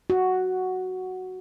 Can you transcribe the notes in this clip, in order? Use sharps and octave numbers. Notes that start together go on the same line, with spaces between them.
F#4